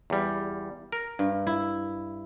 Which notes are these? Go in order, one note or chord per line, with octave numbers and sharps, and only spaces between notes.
E2 G3
A#4
G2
E4